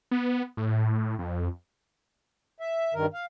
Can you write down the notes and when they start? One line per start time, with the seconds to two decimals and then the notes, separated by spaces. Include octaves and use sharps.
0.11 B3
0.57 A2
1.19 F2
2.60 E5
2.94 G2 D#3 A#4
3.14 F5